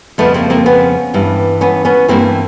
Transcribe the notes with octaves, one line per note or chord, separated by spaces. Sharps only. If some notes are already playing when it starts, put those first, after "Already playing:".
F2 C#3 F3 A3 B3
A#3 C4
A#3 C4
B3 C#4
G2 E3
B3 C#4
B3 C#4
G2 E3 A#3 C4